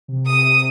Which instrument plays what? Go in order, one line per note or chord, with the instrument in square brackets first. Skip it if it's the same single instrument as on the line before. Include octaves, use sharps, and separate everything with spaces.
[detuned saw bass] C3
[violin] D#6